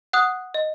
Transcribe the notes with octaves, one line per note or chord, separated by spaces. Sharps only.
F#5 D#6 F#6
D#5